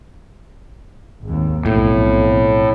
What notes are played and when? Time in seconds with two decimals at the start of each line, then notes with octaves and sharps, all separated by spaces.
1.24 G#1 D#2
1.66 B1 F2 A2